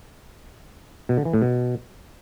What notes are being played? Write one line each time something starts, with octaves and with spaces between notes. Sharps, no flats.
B2
D3
E3
A2
B2